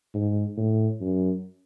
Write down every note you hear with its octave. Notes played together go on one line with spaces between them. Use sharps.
G#2
A2
F#2